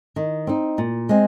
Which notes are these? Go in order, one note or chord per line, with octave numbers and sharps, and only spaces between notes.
D#3
C4 D#4
A#2
G#3 C4